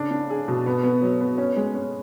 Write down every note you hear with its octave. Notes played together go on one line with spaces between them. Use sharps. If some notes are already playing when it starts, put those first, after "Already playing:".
Already playing: C#3 D4
D4
G#4
B2
B3
B3
F#3
B3
C#4
G#3
C#4